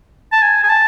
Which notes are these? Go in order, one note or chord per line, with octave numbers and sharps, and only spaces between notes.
A5
G#5
G#5
A5